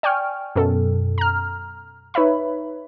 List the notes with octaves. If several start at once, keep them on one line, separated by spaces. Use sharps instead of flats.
D5 G5 G#5 C#6 F6
F#2 B2 A4
A#5 F6
D#4 B4 C#5 E5 B5